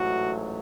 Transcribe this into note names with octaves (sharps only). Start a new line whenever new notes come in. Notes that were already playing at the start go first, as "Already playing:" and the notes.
Already playing: A1 G#2 F#3 A3 F#4